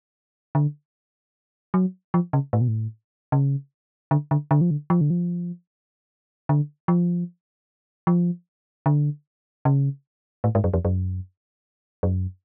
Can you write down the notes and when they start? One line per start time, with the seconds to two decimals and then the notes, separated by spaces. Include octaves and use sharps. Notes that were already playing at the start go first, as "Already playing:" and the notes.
0.55 D3
1.74 F#3
2.14 F3
2.33 C#3
2.53 A2
2.61 B2
2.68 A2
3.32 C#3
4.11 D3
4.31 D3
4.51 D3
4.61 F3
4.71 D3
4.90 F3
5.01 D3
5.10 F3
6.49 D3
6.88 F3
8.07 F3
8.86 D3
9.65 C#3
10.44 A2
10.55 G#2
10.64 F#2
10.74 F2
10.85 F#2
12.03 F#2